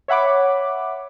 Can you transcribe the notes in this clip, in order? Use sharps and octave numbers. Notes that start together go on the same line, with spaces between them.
C#5 E5 F#5 B5 D6